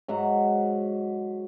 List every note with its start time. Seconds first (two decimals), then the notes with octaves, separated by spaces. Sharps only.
0.08 G#2 F#3 E5 F#5